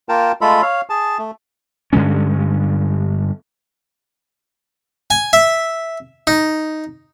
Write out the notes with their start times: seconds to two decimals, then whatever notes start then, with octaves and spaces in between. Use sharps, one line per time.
0.09 A#3 F4 A#4 G5 A5
0.41 G#3 A3 F4 A4 B5
0.62 C#5 F5
0.90 G#4 A5
1.19 A3
1.93 G2 D3 G#3 C#4
5.11 G#5
5.33 E5
6.27 D#4